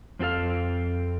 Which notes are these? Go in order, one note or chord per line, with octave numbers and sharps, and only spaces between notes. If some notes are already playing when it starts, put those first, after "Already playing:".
F2 C4 F#4 A4 F5